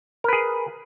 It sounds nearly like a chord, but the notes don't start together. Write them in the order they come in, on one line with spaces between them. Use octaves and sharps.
A#4 B4 G#4